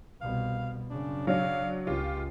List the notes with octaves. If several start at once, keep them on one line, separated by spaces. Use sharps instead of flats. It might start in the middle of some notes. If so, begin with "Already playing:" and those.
C2 B2 F5
F#2 C#3 D4
F#3 D4 F5
C#2 F4 G4